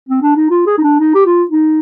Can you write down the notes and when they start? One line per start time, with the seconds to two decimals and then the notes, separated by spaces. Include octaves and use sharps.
0.08 C4
0.22 D4
0.36 D#4
0.50 F4
0.66 G#4
0.78 D#4
0.83 D4
1.00 D#4
1.15 G4
1.26 F4
1.51 D#4